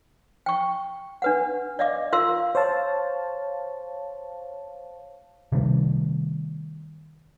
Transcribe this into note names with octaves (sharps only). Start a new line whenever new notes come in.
G5 C#6
D4 B4 F#5
D5 D#5 F5 D6
F4 A#4 F5 C6 E6
C5 C#5 F5 A5
C3 D#3 G3 A3